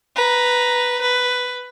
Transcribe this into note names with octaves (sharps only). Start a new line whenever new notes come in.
B4 A#5
B4